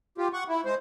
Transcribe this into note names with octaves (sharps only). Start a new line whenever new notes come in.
F4 G4
F#5 C#6
E4
G#3 C5